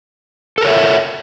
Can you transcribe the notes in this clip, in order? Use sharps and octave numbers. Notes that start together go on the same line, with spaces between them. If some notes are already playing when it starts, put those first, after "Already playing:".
A4 A#4 C#5 E5